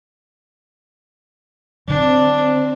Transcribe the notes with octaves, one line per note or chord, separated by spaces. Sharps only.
D3 F#3 C4 D4